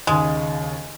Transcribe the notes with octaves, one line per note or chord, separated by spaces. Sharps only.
D#2 C#3 G#3